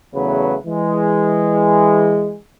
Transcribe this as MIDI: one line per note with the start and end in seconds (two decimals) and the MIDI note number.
0.15 0.56 40
0.15 0.56 49
0.15 0.56 54
0.15 0.56 57
0.15 0.56 71
0.66 2.37 52
0.66 2.37 56